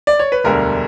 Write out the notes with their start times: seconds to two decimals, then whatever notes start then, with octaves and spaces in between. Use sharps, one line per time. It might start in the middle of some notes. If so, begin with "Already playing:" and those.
0.07 D5
0.19 C#5
0.32 B4
0.44 E1 D2 D3 G3 A#4